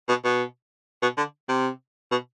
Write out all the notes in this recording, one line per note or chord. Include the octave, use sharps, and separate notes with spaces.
B2
B2
B2
D3
C3
B2